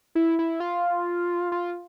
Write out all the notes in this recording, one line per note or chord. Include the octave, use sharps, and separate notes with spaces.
E4
E4
F4
F4